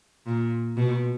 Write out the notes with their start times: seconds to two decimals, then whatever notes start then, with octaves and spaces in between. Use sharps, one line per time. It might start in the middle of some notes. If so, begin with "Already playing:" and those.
0.26 A#2
0.77 B2